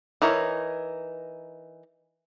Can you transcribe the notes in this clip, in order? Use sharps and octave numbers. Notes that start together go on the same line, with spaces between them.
E3 D#4 A#4 C#5